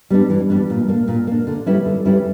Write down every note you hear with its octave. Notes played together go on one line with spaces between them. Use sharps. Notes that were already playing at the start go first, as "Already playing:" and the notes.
G3 B3 D4
E3
G3 B3 D4
A#2
A#3 D4
A#2
A#3 D4
D3
G3 C#4 E4 B4
D3
G3 C#4 E4 B4